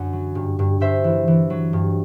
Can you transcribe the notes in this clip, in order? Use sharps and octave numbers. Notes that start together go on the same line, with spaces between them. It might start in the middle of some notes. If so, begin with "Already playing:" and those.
Already playing: F#2 D3 F#5
F#3
G2
G2
G2 C5 E5
E3
E3
F#3
G2